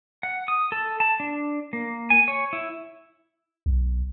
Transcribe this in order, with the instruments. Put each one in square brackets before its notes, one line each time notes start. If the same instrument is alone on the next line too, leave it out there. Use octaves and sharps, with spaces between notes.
[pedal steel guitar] F#5
D#6
A4
A5
D4
A#3
G#5
C#5
E4
[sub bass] B1